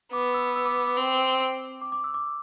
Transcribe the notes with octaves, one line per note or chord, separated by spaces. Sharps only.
B3 D6
E6
E6
D6
D6
D6
C4
D6
D6
E6
D6